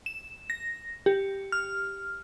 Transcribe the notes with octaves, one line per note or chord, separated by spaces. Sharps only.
E7
A#6
G4
F6